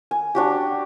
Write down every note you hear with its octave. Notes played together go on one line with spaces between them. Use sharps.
G#5
D4 F#4 G4